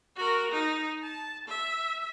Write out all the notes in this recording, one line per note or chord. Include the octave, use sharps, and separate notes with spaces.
F#4 A#4
D#4
A5
E5